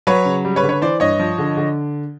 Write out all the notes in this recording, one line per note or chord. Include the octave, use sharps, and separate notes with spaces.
F#3 B4 C#5
C#3
G3
B4 C#5
D3
B4 C#5
E3 C5 D5
G2 C#5 D#5
F3
D3
D3